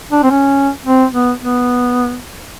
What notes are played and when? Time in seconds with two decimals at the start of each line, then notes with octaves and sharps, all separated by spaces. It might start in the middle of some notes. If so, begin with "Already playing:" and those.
0.12 D4
0.23 C4
0.31 C#4
0.86 C4
1.13 B3
1.40 B3